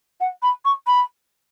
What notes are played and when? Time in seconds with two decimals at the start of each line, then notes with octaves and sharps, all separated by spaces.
0.20 F#5
0.42 B5
0.65 C#6
0.87 B5